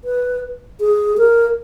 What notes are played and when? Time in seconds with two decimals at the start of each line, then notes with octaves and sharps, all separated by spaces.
0.04 B4
0.80 G#4
1.18 A#4